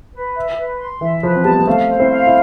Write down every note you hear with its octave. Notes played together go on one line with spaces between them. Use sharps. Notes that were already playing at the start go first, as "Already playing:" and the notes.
B4
E5
B4
C6
E3 E5
F3 B4
C4
G3 B3 A5
B3
A3 C4 F5
C5
C4 E4
F5
E4